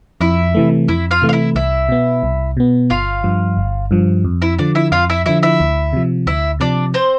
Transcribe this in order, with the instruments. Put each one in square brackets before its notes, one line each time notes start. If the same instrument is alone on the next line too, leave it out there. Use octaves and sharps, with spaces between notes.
[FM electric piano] F2 [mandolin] E4 E5
[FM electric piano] C3 E3 A3
[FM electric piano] F2 [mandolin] E4 E5
[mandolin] F4 F5
[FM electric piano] C3 E3 A3
[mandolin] F5
E4 E5
[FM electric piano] C2 [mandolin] E4 E5
[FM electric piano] B2 B3
C2
B2 B3
[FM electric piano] G1 [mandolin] F4 F5
[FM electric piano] G2 F3
G1
G2 F3
F2
[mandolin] E4 E5
[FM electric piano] D3 F3 [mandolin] D4 D5
[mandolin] E4 E5
[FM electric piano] F2 [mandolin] F4 F5
[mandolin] E4 E5
[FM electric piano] D3 F3 [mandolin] E4 E5
[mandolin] E4 E5
[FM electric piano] D2
C3 F3
[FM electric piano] D2 [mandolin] E4 E5
[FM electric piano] C3 F3 [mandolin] D4 D5
[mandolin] C4 C5